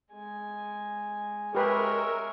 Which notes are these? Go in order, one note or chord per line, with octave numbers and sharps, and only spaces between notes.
G#3 G#5
G#3 G4 A#4 B4 C#5 E5